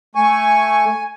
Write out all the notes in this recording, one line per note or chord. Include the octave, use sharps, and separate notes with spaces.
A3 G#5 C#6